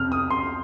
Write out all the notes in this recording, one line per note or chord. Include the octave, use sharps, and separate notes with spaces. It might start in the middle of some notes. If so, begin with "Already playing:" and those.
Already playing: F2 C3 F6
D#6
C6